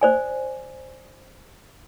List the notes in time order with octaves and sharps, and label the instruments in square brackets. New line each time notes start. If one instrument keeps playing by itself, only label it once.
[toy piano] C5 D5 G#5